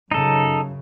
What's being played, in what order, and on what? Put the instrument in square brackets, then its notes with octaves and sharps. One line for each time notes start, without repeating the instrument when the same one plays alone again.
[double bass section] F#2 C#3 [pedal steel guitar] D#4 A4